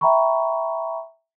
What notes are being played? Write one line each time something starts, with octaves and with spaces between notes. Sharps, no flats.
E5 G5 A#5 B5 C#6